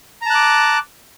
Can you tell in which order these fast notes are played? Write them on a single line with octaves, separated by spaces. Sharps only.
A#5 A5 F#6 D6